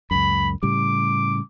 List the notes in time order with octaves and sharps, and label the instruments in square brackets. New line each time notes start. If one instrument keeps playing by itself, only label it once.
[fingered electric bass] C#2 F#2 [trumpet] B5
[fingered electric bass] A2 C#3 G3 [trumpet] D6